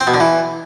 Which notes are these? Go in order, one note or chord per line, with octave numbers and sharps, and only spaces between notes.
C4
B2
D3
E3